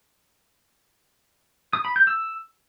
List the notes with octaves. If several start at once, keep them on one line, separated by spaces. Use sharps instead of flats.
D#6
B5
G6
E6